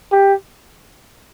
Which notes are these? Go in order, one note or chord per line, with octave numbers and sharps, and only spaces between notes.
G4